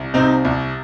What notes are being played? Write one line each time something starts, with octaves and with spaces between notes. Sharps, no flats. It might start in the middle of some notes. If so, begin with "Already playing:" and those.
Already playing: C2
C3 C4 D#4
C2